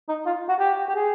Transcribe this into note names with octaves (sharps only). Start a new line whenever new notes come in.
D#4
F4
F#4
G4
G4
G#4